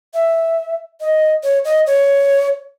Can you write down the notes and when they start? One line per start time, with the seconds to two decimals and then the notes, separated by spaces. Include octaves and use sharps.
0.14 E5
1.01 D#5
1.43 C#5
1.65 D#5
1.87 C#5